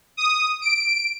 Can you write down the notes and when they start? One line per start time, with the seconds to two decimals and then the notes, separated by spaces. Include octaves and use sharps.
0.17 D#6
0.61 D7